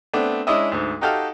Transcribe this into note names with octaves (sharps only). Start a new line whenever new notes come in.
A3 B3 C4 D4
G#3 C#4 D4 E4 D#5 E5
D2 G#2
D#4 F#4 G4 A4 F5